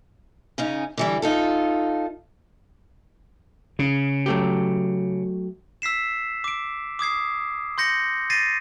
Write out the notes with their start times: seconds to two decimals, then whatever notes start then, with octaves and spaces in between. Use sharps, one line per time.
0.58 C#3 C#4 D#4
0.97 D3 E3 G3
1.22 D#4 F4 A4
3.79 C#3
4.26 F#3 A3 G4
5.82 E6 B6 C7 E7
6.44 D6 D7
6.99 D6 D#6 G#6 C7
7.78 C6 G6 A#6 C#7
8.30 A6 A#6 C7 D#7